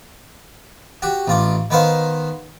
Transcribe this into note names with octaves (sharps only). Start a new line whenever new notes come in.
F#4 G4
A1 F4 D6
D#3 B3 C5 F5